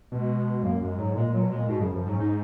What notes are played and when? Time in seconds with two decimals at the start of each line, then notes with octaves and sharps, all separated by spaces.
0.12 B2 G#3
0.63 F#2 A#3
0.81 F#2 G#3
0.98 G#2 F#3
1.15 A#2 G#3
1.28 A#2 F#3
1.41 B2
1.50 A#2 G#3
1.68 G#2 B2
1.80 F#2 C#3
1.92 F#2 F3
2.06 G#2 F#3
2.14 C#4
2.19 G#2 D#4